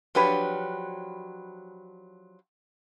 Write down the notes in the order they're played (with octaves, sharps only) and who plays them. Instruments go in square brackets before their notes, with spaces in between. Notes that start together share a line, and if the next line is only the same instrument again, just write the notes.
[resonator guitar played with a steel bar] F3 F#3 D4 G4 B4 C#5